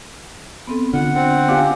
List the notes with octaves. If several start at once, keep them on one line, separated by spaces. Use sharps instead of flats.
B3 C4 A4
D3 F4 F#5
C4 F#5
D4 F4 G4 F5 G5 G#5